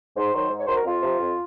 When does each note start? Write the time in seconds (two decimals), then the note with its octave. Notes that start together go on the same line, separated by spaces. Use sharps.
0.16 G#2 C5
0.34 D#3 F#3 C5
0.50 G#2
0.59 C#5
0.67 D#3 F#3 C5
0.76 A#4
0.85 F2 F4
1.03 C3 F3
1.20 F2